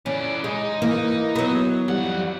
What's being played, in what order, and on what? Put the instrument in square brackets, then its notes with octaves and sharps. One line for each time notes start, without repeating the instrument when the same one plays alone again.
[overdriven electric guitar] E3 D5 [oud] C#4
[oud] G#3 [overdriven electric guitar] D#4
[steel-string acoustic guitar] E3 [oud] A#3
[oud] F#3 B3
[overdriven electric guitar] F2 F#5 [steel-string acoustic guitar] G3